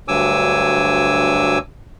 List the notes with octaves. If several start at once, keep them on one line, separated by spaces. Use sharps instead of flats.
D2 G2 F#3 G#5 D6 E6